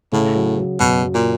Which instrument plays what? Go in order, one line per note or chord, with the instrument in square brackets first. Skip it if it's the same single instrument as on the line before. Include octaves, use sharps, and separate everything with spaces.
[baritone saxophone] A2 [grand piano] C#3
[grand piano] F#3
F#3
[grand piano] F#2 [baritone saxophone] B2
[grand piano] F#3
[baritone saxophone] A#2